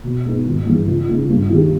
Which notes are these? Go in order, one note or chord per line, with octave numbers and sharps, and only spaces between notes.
B2
G#3 B3 D#4
G#1
G2 E3 G#3
C#2
C#3 G#3 D#4
G2
D#3 G#3 D#4 G4